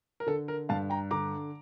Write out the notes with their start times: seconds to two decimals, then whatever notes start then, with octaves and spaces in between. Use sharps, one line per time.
0.20 A#4
0.26 D3 A4
0.48 A#4
0.69 G2 F5 A5
0.90 G5 A#5
1.11 D3 A#5 D6